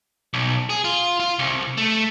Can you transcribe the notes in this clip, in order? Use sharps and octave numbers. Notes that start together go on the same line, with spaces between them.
B1
G#4
F4
F4
C2
A3